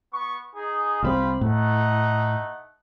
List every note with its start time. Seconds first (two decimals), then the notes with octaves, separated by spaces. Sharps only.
0.12 B3 C#6
0.55 D#4 G#4
1.03 C2 G3 C4 F4 G4 B5
1.41 A2 A3 D#4 F#5